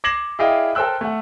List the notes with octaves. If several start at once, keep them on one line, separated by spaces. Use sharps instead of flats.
D6 G#6 A#6 C7 E7 F#7
E4 G#4 D5 D#5 F5 G5
A4 A#4 C5 G5 E6 F#6
A3 F#5